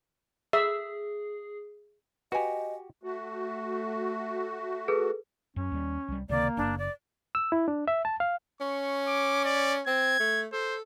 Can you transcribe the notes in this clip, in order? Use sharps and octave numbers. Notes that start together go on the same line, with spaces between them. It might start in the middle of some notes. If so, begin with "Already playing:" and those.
G#4 E5
F#4 G4 B4 D#5 G#5
A3 F#4
G#4 A4 B4
F#2 C#4
D#2 G3
C2 G3
C#2 C3 D#3 A#3 D5
F#1 D4
D5
E6
E4
D4
E5
A5
F5
C#4 C#6
D6
D5
C4 G#6
A3
A4 C5